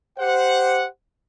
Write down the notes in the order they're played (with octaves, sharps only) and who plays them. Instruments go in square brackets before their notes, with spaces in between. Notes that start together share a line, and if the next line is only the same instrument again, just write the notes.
[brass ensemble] G4 C5 F#5